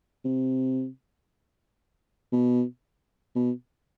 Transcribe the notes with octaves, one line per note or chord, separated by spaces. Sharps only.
C3
B2
B2